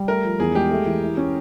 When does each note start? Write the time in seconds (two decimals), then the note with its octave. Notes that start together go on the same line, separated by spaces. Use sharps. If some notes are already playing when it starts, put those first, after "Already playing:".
Already playing: G3
0.08 A3 A#4
0.24 F3
0.39 E2 G#4
0.55 G#3 G4
0.71 A3
0.86 E3
1.02 E4
1.17 C#4